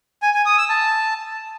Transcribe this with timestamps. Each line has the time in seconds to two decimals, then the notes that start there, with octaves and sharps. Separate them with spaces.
0.22 G#5
0.34 G#5
0.46 D#6
0.57 E6
0.69 A5